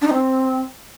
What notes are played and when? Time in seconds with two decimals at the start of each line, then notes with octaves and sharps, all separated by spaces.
0.01 D4
0.07 D#4
0.13 C4